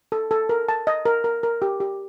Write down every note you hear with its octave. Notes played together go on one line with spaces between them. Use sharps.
A4
A4
A#4
A5
D#5
A#4
A#4
A#4
G4
G4